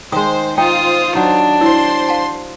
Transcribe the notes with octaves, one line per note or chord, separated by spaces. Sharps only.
D#3 G#3 C5 D#6
D#4 F4 C5 G5 D#6
F#3 D4 D#4
E4 C5 C#5 C6 E6
F5 A5